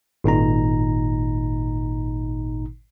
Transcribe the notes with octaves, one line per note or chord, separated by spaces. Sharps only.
G#1 A#2 D#4 A#5